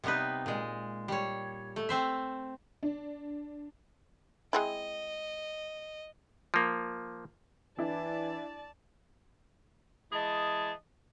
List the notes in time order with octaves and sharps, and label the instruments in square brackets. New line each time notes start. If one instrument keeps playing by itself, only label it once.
[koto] C3 G3 B3 D#4 B4
A#2 G#3
G3 C#5
A3
C4 C5 E5
[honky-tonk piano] D4
[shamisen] G#3 C4 E4 [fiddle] D#5
[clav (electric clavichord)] F3 A#3
[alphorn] E3 [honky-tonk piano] D4 E4 [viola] D5 A5
[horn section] E3 G#3 G#4 D#5 A5